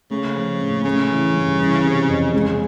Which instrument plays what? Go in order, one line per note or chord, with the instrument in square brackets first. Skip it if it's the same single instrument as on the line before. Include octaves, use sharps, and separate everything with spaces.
[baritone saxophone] C#3 [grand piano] A3
[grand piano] F3
A2
[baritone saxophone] C#3 [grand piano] A3
[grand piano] E3
G2
E3
C3
F2
[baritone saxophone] C#3 [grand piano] G#3